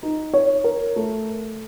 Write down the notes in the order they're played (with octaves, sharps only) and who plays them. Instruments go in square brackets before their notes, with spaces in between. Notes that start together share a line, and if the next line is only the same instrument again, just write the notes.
[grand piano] D#4
C#5
A#4
A3